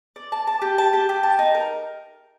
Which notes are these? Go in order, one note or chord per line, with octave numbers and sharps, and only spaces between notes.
D5
A5
A5
G4
A5
G4
G4
A5
D#4
A#4